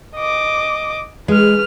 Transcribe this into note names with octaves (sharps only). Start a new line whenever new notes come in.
D#5 D6
G#3 B4 F6